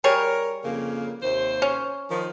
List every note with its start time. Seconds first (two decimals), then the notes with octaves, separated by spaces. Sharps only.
0.04 G3 G#4 A#4 C#5
0.64 F2 C#3 A#3
1.23 D#2 C3 C5
1.62 C#4
2.10 D#3 F3